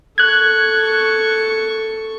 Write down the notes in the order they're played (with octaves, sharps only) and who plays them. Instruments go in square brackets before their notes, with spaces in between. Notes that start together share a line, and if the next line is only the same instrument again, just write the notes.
[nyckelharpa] A4 C#6 [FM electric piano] F#6 G#6